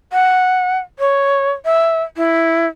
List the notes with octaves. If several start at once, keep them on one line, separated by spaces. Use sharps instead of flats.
F#5
C#5
E5
E4